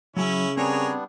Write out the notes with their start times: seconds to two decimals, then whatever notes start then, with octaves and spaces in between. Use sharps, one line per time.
0.17 C#3 F#3 C#4 E4 G#5
0.57 G3 B3 C4 D4 G#4 A#4 C#5